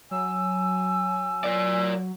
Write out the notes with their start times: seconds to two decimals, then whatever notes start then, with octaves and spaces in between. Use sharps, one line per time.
0.11 F#3 G#5 E6
1.44 A#4 D5